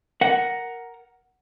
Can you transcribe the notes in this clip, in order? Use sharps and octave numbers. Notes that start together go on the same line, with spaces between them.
A#4 F#5